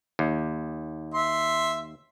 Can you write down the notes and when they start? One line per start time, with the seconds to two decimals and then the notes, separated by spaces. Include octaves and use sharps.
0.19 D#2
1.14 E5 C6